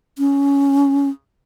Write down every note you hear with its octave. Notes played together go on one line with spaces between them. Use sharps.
C#4